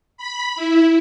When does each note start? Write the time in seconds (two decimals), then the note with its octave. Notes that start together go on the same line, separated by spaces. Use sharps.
0.18 B5
0.56 E4